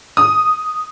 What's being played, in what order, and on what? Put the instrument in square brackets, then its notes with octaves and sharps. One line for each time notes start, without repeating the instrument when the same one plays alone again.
[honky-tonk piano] D#6